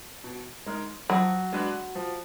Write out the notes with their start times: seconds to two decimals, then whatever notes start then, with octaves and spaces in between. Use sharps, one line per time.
0.24 B2
0.66 G#3 D#4 A#4
1.10 F3 F#3
1.53 G#3 D4 F#4 B4
1.95 F3